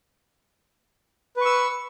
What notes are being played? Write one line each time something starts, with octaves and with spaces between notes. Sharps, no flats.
B4 C#6 E6